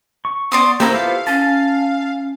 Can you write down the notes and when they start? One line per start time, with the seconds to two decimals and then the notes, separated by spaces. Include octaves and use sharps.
0.25 C#6
0.52 B3 D5 C6 D#6
0.80 A#3 E4 G4 A4 C5 E5 A#5 E6
0.94 B3 F4 G4 F5
1.27 C#4 A5